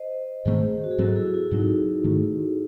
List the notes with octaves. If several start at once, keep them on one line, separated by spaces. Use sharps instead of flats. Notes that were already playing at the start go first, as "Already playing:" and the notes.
Already playing: C5 D#5
G#2 D#3 A3 C4 G#4 C5
F#4
G#4
G#2 F#3 C4 F#4 A4
E4 G#4
E4
G#2 F#3 C4 D#4
G#2 D#3 A3